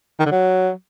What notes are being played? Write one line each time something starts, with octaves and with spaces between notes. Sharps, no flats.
D#3
D3
F#3